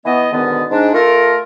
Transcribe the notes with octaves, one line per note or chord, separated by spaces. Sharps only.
E3 B3 D#5
G#2 B2 D3 D#3 B3
G#2 D4
A3 F4 A#4